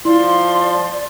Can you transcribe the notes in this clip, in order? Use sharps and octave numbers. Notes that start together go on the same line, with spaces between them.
F3 E4 D5 C6